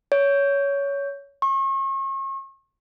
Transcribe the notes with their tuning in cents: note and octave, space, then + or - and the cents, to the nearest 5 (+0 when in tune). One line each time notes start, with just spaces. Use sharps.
C#5 +15
C#6 -40